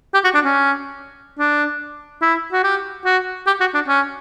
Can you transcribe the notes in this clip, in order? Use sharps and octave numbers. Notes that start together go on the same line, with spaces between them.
G4
F#4
D4
C#4
D4
E4
F#4
G4
F#4
G4
F#4
D4
C#4